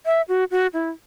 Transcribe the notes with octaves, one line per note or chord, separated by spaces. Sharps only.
E5
F#4
F#4
E4